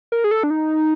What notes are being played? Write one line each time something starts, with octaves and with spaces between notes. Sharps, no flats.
A#4
G#4
A4
D4
D#4